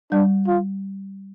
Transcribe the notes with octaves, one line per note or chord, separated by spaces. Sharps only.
G3 D4
F4